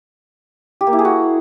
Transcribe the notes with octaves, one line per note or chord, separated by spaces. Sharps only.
G4
A#3
E4
G#4
F#4